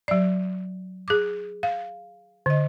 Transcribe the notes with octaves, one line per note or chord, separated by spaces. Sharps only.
F#3 D5
G#4 D6
F5
D3 D#5